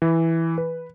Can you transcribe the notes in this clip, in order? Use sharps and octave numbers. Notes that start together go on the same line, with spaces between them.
E3
B4